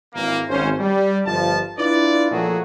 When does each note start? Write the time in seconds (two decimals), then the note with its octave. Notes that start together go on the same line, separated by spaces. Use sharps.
0.14 G#1 E3 A#3
0.49 G#1 C#4 C5
0.79 G3
1.26 G1 F3 A5
1.78 D4 E4 F4 B4 D5
2.31 A#2 F3 F#3 A3 F#4 G#4